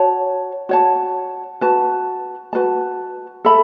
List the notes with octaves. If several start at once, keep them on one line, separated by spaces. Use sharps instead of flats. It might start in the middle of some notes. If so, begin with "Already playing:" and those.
Already playing: F#4 C#5 A5
F#4 C#5 A5
F#4 B4 A5
F#4 B4 A5
A4 E5 B5